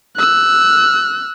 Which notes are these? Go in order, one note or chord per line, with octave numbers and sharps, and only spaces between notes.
E6 F#6